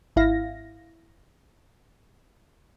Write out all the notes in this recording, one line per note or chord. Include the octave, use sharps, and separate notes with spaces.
G#1 E4 F5 A#6